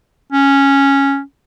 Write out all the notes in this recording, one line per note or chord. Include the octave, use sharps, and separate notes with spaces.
C#4